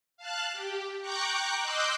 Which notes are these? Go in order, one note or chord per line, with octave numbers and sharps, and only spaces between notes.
F5 A5 F#6
G4
G5 A#5 C#6 D6 F#6 G6
D#5 C6 D6 E6 F#6 G6